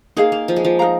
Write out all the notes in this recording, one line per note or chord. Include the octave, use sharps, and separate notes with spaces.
A#3 D#4 G#4 F5
A#3
F3
G#3
F3
D#4 A#4 F5 A#5